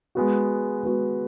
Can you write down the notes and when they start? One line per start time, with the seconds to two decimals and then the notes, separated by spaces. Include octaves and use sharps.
0.15 G#3 B3 F#4
0.83 G#3 B3 F#4